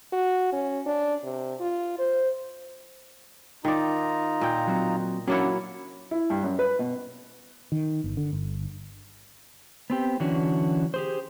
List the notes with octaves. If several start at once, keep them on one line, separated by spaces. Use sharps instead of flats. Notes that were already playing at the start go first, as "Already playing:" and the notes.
F#4
C#4
D4
C3
F4
C5
D#3 D#4 F4 D5 A#5
A#2 G5
F#3 C4
F#3 A#3 C#4 D4 E4 F#5
E4
G2
F#2
B4
B2
D#3
G1
D3
G1
B3 C4 G4
D3 E3 F#3 C#4 D4 F#4
G4 G#4 C5